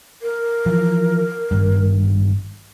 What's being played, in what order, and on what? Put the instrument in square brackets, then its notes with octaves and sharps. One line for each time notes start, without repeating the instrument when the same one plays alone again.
[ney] A#4
[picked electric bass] E3 F3
G#1 G2